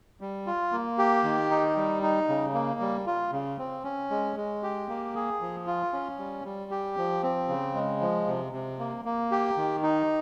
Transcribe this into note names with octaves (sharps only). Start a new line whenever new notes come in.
G3
F4
A#3
G4
D#3
D#4
G3
D#4
C#3
A#3
G3
F4
C#3
C4
C#4
G#3
G#3
G4
A#3
G#4
F3
F4
C#4
G3
G3
G4
F3
C4
C#3
G#3
F3
C3
C3
A#3
A#3
G4
D#3
D#4